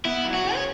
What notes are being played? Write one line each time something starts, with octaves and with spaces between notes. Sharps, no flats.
B3 E4
F#3
F#4
C#3
C#5